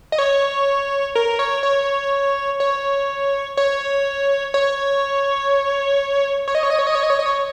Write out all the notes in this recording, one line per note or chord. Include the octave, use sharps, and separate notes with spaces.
D#5
C#5
A#4
C#5
C#5
C#5
C#5
C#5
C#5
D#5
C#5
D#5
C#5
D#5
C#5
D#5
C#5
D#5
C#5